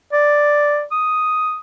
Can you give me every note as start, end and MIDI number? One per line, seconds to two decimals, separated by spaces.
0.13 0.83 74
0.91 1.59 87